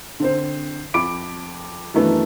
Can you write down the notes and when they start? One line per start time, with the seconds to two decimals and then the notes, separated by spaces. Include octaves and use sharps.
0.20 D3 C4 C5
0.94 F2 B5 D6 D7
1.94 F#2 D#3 E3 A3 B3 D4